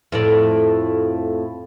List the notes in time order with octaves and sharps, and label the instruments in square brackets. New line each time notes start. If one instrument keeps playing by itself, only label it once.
[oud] F2 A2 D5